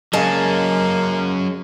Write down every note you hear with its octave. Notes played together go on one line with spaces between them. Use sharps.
C#3 F#3 G#3 A#3 C#4 G#5 A5